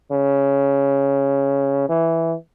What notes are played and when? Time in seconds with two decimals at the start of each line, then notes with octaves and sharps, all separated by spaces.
0.11 C#3
1.89 E3